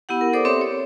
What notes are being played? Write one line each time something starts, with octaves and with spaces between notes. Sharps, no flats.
B3 E4 G4 F#5
A#4
A4 C5 D5 D6 D#6
C4 G4 A4 C#5 E5
C#5